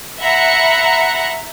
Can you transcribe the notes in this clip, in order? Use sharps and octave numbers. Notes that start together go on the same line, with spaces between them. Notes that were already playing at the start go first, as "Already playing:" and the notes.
E5 F#5 A#5 B5 F#6 C#7